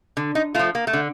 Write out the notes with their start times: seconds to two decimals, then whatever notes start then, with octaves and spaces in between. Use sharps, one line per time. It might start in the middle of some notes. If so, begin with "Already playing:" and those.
0.17 D3
0.35 D#4
0.55 A3 F4
0.59 F3
0.75 A#3
0.87 A3
0.93 D3